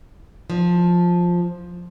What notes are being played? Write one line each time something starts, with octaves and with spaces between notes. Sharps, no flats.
F3